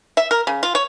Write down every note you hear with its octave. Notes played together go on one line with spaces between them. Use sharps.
E5
A#4
C#3
F4
C#5